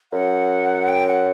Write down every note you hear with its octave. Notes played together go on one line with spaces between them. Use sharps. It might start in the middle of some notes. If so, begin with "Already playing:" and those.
F#2 F#5
G5
F#5